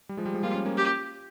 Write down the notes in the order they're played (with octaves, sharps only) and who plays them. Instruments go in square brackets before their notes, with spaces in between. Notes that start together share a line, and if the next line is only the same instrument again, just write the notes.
[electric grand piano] G3
F3 G#3
G3
F3 G#3
[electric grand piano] G3 A#3 [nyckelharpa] F4
[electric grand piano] A#3 C#4
A#3 C#4
[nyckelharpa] G4